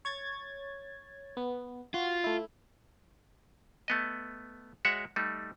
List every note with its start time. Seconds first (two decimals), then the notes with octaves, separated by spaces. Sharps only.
0.05 C#5 G#6 A6
1.37 B3
1.94 F4 F#4
2.24 A3 E4
3.88 A3 B3 D#5
4.85 G#3 F#4 C#5 E5 F#5
5.16 G3 A3 D#4